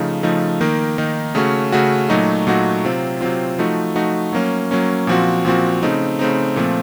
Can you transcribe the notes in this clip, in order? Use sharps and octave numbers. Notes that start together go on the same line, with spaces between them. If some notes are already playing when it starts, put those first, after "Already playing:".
Already playing: C#3 F3 A3 D#4
C#3 F3 A3 D#4
D#3 A#3 D#4
D#3 A#3 D#4
C#3 A3 C#4 F#4
C#3 A3 C#4 F#4
A#2 F#3 A3 D#4 F#4
A#2 F#3 A3 D#4 F#4
C3 F#3 C4 F4
C3 F#3 C4 F4
F3 A3 D#4 F#4
F3 A3 D#4 F#4
F#3 A#3 C#4
F#3 A#3 C#4
A#2 F3 C4 F#4
A#2 F3 C4 F#4
C#3 A3 C4 D#4
C#3 A3 C4 D#4
A#2 F3 A3 C4